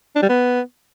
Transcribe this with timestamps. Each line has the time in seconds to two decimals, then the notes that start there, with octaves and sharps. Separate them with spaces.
0.16 D4
0.23 G3
0.29 B3